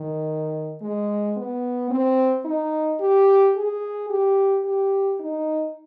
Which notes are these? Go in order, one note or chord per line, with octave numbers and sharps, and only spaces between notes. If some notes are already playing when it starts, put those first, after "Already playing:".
Already playing: D#3
G#3
B3
C4
D#4
G4
G#4
G4
G4
D#4